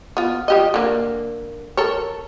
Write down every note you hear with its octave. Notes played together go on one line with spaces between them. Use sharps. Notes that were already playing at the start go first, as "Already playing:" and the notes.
B3 F4
F3 G4 D#5
D3 A#3
A4 A#4 C#5